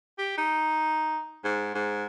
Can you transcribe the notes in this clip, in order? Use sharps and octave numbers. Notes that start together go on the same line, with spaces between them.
G4
D#4
G#2
G#2